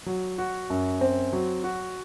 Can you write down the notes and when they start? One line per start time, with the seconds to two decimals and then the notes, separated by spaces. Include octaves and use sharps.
0.06 F#3
0.38 F#4
0.70 F#2
1.01 C4
1.33 F#3
1.64 F#4